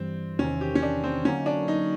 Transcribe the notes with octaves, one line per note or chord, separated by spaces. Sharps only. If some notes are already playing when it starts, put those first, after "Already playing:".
Already playing: G2 E3 G3 C4
E2 C3 D#3 C#4
G4
C#4
D4
C4
D3 F#3 A#3 C#4 D#4
D4
D#4